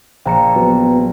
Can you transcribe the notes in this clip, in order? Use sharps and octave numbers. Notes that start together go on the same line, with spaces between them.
A#1 G5 A#5 C#7
F#3 B3